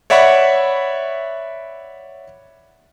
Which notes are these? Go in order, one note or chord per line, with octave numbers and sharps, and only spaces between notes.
C#5 D5 E5 F#5 B5 C#6